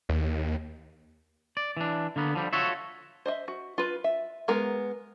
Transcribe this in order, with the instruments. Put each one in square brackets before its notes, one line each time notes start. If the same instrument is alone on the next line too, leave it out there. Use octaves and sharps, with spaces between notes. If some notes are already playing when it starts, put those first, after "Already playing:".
[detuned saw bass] D#2
[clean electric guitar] D5
E3 D4
D3 A#3 B3
D3 F3 G3
F4 F#4 A4 C#5 E5
[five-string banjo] C5 D#5 E5
F#4
F4 B4
E5
G#3 B3 A#4